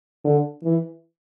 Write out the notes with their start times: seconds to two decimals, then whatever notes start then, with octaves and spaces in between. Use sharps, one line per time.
0.25 D3
0.64 E3